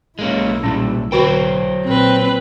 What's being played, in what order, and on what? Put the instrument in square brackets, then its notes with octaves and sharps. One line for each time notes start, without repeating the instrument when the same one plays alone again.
[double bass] B1 E4 [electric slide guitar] G#3 A#3 C#4
[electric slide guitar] A#2 G3 [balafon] C#4
[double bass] B1 [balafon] D3 F#4 B5 [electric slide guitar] F#3 C5 G5
[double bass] A#2 [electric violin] C4 B4